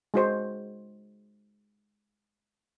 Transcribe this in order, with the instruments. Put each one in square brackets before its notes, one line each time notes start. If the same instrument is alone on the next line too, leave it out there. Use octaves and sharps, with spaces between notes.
[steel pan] G#3 F#4 C5